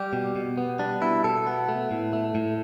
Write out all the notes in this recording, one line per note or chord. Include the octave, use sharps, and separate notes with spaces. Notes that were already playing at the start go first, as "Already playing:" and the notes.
Already playing: G3 G4
B2
B2
B3
G3 D4
B2 E4
B2 A4
B3
A3
A2
A3
A2